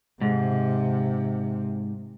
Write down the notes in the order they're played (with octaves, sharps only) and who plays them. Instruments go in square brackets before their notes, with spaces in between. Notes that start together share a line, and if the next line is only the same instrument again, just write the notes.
[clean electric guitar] G#2 [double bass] C3